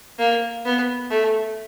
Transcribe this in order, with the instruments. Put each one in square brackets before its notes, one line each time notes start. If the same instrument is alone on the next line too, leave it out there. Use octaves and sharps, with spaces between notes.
[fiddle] A#3
B3
A3